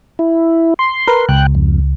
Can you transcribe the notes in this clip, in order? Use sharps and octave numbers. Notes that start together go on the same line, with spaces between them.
E4
C6
A#4 B4
C#2 G5 F#6
F2